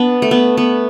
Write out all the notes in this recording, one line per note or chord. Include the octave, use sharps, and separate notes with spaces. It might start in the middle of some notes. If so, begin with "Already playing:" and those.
Already playing: B3 D4
A3
B3
B3